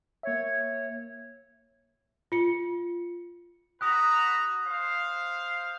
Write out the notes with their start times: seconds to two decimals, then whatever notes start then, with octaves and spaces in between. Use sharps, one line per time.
0.23 A#3 C#5 E5
2.32 F4 C#7
3.81 F#4 B4 A#5 D#6 F#6
4.67 C5 F5